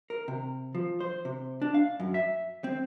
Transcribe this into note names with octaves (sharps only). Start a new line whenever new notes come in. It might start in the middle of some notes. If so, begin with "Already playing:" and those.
A#4
C3
F3
C5
C3
D4
F5
F#2
E5
C4